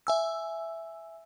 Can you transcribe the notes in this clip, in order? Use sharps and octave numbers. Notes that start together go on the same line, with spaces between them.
E5 G#5 E6